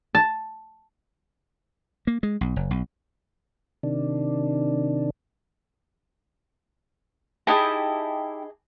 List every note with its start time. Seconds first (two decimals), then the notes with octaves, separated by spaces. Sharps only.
0.15 A5
2.07 A#3
2.23 G#3
2.41 B1
2.56 F#1
2.71 B1
3.83 C3 D#3 D4
7.47 D#4 E4 G4 G#4 D#5 A5